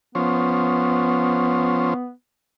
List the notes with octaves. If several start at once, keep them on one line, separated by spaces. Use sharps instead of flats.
F3 B3 C#4 C5